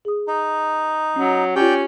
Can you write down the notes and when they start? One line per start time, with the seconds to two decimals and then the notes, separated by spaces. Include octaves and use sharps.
0.05 G#4 D#6
0.28 D#4
1.16 F#3 C#4
1.56 C#4 F4 G4 D5 G5